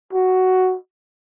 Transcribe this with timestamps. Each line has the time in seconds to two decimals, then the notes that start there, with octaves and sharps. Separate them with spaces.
0.13 F#4